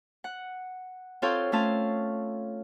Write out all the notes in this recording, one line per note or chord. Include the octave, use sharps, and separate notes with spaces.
F#5
C4 F4 A4 C#5 F5 G5
A3 C#4 F4 F5 A5